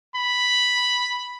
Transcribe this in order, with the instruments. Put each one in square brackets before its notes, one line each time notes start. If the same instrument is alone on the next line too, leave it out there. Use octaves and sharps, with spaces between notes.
[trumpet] B5